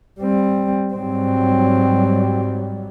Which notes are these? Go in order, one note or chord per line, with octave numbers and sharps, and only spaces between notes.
G3 C4
G#2 F#3 G3 C4